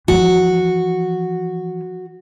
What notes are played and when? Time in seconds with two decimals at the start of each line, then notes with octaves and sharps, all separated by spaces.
0.08 E3 F3 F#4